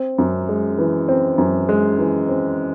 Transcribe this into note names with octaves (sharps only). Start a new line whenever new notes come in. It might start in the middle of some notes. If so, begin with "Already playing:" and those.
Already playing: C4
F#2
G#3
E3
C4
F#2
G#3
E3
C4